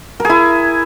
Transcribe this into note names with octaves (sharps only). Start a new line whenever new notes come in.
E4 G#4 A#4